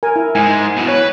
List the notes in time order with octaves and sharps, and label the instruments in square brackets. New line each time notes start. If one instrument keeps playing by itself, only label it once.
[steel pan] A#4 G#5
E4
[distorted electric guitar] G#2 G#3 [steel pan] G#5
[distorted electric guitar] B2 E3
[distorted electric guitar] B4 [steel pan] C#5